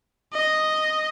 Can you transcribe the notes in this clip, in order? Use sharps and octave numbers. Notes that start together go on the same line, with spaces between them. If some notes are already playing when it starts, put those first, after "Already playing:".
D#5